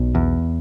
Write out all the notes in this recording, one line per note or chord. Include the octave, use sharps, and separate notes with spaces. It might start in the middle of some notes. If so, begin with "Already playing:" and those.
Already playing: B1 B3
E2